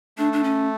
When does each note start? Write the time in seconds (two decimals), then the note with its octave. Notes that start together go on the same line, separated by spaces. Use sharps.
0.18 A3 D4
0.33 D4
0.44 C#4